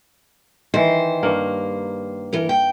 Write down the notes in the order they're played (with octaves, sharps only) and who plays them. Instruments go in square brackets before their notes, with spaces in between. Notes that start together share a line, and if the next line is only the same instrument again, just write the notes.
[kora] D#3 E3 [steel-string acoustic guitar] C5
[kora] G2 A#3
[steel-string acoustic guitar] E3 A#4
G5